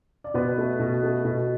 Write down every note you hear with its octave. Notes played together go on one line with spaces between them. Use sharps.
D5
B2 B3 B4
A3
B2
A3
B2